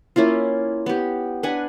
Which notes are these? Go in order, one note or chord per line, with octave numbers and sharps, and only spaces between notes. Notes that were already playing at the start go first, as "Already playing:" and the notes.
A#3 C#4 E4 F4
B3 G4
D4 B4 F#5 G#5